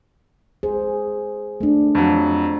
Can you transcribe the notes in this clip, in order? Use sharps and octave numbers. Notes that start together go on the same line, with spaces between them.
G#4 C5
A3 D4
F2 F#3